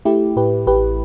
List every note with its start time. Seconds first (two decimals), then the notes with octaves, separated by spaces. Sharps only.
0.05 A3 E4 G4
0.36 A2 G4 B4
0.67 A1 G4 B4